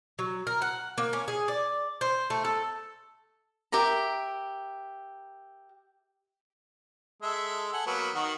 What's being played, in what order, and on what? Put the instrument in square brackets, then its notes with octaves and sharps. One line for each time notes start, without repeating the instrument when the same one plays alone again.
[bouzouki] F#3
A#4
F#5
A#3
C#4
G#4
D5
C5
A3
A4
[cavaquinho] G4 A#4 E5 A#5
[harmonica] G#3 A4 E5
A4 F#5 G#5
F#3 A#3 B3
D#3 F#4